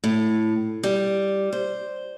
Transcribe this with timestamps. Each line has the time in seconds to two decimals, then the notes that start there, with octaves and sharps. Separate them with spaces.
0.04 A2
0.83 G3
1.53 C5